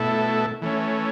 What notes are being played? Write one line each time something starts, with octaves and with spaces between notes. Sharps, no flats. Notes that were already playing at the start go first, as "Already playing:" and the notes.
Already playing: B2 A3 E4 A4
E3 A3 C#4